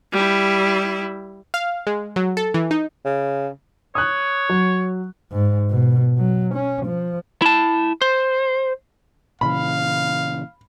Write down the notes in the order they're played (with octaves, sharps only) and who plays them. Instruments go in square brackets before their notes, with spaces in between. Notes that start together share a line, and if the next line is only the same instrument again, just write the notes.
[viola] G3 E4
[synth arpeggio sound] F5
G#3
F#3
A4
E3
D#4
[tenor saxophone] C#3
[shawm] C#5 [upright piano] D#6 F#6
[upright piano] F#3
[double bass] G#2
B2
F#3
C#4
F3
[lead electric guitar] E4 A5
C5
[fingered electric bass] A#2 C#3 E3 [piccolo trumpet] F5 [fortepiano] B5